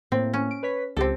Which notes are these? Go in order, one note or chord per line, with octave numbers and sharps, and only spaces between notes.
A2 A#3 C4
C#4
D7
B4 C#5 B6
C#2 C4 G4 A4